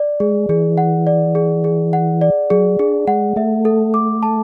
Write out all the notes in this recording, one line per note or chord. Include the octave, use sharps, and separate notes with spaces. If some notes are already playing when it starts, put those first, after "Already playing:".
Already playing: D5
G#3 G#4
E3 G#4
F#5
D5
G#4
G#4
F#5
D5
F#3 G#4
D4 G#4
G#3 F#5
A3 E5
A4
D6
A5